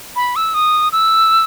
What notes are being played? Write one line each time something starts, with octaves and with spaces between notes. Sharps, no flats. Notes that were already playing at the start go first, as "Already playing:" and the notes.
B5
E6
D#6
E6